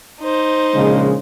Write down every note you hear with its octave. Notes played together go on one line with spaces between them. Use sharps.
D#4 C5
A#1 C#3 G#3